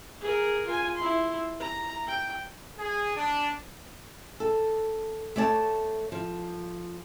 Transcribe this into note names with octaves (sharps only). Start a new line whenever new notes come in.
G#4 A#4
F4 G#5
E4 C6
A#5
G5
G#4
D4
A4
A3 C#5 D5 F5 A5
F3